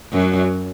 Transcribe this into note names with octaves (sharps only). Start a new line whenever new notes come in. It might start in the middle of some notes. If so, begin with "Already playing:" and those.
F#2 F#3